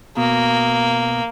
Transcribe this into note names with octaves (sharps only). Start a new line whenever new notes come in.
B2 A#3